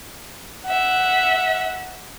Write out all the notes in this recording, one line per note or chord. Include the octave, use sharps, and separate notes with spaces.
E5 F#5